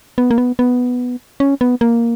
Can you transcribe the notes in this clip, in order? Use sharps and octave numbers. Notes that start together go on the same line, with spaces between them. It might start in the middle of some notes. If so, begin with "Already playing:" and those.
B3
A#3
B3
B3
C#4
B3
A#3